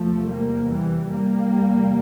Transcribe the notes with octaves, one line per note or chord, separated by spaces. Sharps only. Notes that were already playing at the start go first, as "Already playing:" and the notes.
Already playing: E2 C3 F3 A3
G3 A#3
E3 G3
G3 A#3
E2 C3